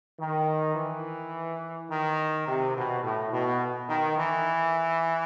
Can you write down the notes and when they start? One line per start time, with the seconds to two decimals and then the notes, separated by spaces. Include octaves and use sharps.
0.20 D#3
0.76 E3
1.90 D#3
2.48 C3
2.76 B2
3.03 A2
3.33 B2
3.89 D#3
4.17 E3